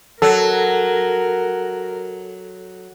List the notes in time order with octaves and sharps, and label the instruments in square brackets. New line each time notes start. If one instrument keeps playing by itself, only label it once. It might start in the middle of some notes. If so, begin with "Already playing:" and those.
[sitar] F#3 [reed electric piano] A4 [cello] A#4